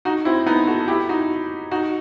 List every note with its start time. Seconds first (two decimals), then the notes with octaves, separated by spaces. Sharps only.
0.05 D#4 F#4
0.25 C4 E4
0.46 B3 D#4
0.67 F#4 A4
0.88 E4 G4
1.09 D#4 F#4
1.71 D#4 F#4